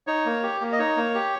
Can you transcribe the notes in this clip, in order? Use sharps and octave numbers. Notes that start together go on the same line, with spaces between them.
D#4 C#5
A#3
G4
A#3
D#5
D#4 C#5
A#3
G4